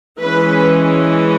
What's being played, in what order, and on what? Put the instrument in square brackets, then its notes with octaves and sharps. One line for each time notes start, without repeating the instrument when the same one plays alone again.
[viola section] E3 G#3 C#4 B4